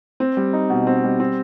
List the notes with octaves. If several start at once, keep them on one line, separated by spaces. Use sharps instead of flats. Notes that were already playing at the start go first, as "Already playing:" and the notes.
C4
G3
D#4
B2
C4
G3
C4